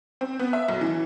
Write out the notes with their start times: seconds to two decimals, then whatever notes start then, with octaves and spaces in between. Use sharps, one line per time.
0.21 C4
0.39 B3
0.53 E5
0.68 B1
0.81 E3